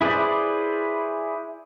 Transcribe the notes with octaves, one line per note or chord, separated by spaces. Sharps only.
E4 G#4 B4 C5 D5